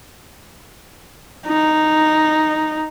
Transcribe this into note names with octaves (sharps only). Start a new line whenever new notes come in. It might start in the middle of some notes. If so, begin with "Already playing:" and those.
D#4